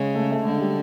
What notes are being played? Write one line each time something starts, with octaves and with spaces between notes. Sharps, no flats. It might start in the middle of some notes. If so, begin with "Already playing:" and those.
Already playing: C#3 G#3
A3
A3
D3 G#3
G3